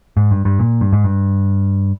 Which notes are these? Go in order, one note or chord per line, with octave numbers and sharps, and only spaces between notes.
G#2
G2
G2
A#2
G2
G#2
G2